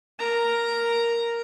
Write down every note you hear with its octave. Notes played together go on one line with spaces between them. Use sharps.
A#4 A#5